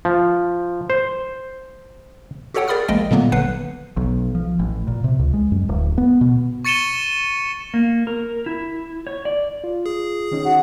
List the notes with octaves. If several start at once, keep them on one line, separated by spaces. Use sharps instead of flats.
F3
C5
F#4 G4 A4 C#5 F#5 G5
G#4 A#4 D5 B5 D#6 F6
A1 F3 G#3 A#3 D#5 G5
A#2 D3 F#3 G3 A#3 B3
G#1 D3 F#3 B4 F#5 C7
B1
F3
A1
A#2
C3
C#2
G#3
F#2
D1
B3
B2
C#6 A6 C#7 D#7 E7 G7
A#3
A#4
E4
C#5
D5
F4
G#4
D#3 C#4 D#4
F#4